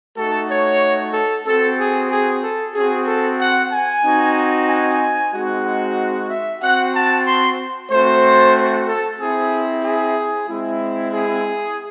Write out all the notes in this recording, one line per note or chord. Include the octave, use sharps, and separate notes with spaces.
A3 D#4 F#4 A4
C#5
A4
C4 F#4 A4
G#4
G#4
A4
C4 F#4 G#4
A4
F#5
G#5
C4 D#4 F#4
G#5
G#3 C4 D#4 F#4
F#5
E5
C4 F#4 F#5
A5
C6
A3 C4 F#4 C5
A4
C4 E4 G#4
G#4
G#3 C4 E4
G#4